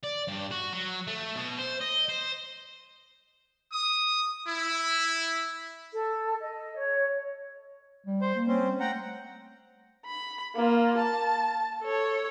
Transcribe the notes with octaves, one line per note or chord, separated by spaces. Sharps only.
D5
G2
F#4
F#3
A3
B2
C5
D#5
C5
D#6
E4
A4
D#5
C#5
G3
C5
A#3
C4 C#4
G3
A3 F#5 G5 A#5
B5
A#3 F4
A5
A4 C#5